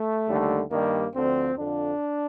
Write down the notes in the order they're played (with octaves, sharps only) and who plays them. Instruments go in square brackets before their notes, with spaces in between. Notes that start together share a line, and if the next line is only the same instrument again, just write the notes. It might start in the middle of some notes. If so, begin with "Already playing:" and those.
Already playing: [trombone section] A3
D#2 D3 G3
G2 D#3 G3 A#3
D2 D3 F3 C4
F2 D3 F3 D4